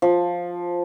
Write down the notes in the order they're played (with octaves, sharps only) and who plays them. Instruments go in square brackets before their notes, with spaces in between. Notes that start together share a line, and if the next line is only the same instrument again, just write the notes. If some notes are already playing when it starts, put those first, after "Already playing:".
[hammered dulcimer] F3